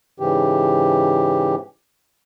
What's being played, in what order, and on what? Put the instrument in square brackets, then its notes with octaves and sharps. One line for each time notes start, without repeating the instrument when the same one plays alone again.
[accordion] G#2 C#3 E3 G4